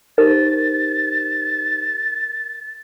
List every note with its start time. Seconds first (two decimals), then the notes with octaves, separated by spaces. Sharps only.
0.18 D#4 G4 A#4 C5 A6